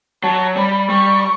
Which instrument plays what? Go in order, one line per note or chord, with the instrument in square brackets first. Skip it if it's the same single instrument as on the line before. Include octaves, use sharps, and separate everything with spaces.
[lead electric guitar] F#3 [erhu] A5
[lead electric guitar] G3 [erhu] B5
[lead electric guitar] G3 [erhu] C#6